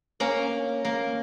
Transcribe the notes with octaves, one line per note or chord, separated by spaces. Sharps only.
A#3 C#4
A#3